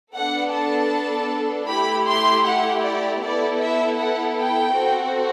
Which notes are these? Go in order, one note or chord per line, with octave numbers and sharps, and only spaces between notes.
B3 D4 A4 F#5
A5
A3 E4 G4 B5
C6
F#5
D5
B3 E4 A4 D5
E5
F#5
G5
C4 F#4 A4